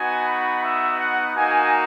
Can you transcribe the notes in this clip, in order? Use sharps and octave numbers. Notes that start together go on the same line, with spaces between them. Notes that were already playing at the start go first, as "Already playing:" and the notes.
Already playing: B3 D#4 F#4 G#5
B5
E5
F#5
A#3 D#4 F#4 G#5